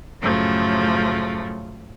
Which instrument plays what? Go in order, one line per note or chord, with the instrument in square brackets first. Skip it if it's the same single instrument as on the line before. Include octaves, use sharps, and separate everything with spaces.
[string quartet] F#2 A2 C#3 F3 F#3 A3